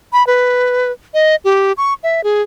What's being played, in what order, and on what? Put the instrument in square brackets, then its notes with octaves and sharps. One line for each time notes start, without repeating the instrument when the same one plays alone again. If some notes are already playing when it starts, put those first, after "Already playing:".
[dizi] B5
B4
D#5
G4
C#6
E5
G#4